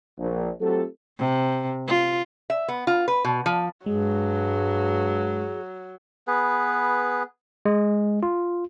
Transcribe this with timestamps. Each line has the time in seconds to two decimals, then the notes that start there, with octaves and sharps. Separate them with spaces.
0.18 A#1
0.60 F#3 A3 C4 F4 G4 A4
1.19 C3
1.87 F4
2.50 E5
2.68 B3
2.87 F4
3.08 B4
3.25 B2
3.46 F3
3.86 G2 F#3 G#3 G#4
6.27 B3 G#4 B4
7.65 G#3
8.23 F4